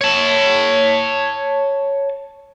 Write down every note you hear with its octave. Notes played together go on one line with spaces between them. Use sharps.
C#5 A5